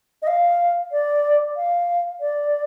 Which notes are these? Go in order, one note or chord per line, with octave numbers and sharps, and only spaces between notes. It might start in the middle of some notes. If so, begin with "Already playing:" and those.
D#5
F5
D5
F5
D5